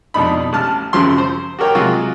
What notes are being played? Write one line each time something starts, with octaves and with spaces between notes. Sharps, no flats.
F2 B2 D4 D#4 B5
A1 A5 F6
G#1 F#2 C#3 F3 F#3 C6
C5
F#4 G4 A#4 C#5 G5
C3 F#3 G#3 F4 F#4